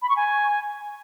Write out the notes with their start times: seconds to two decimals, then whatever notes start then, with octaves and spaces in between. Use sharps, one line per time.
0.02 B5
0.09 C#6
0.16 G#5